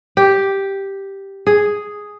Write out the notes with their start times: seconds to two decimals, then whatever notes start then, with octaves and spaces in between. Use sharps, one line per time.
0.17 G4
1.47 G#4